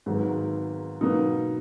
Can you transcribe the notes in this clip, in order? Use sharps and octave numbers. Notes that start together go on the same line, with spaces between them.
G#1 G#2 F#3 B3
B2 F#3 A#3 D#4